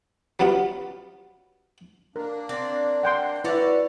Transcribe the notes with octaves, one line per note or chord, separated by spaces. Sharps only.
F#3 G3 B3 F4
A#3 D4 A#4
C4 D5
F#5 G5 C6
E4 F#4 B4 C#5 D5 E5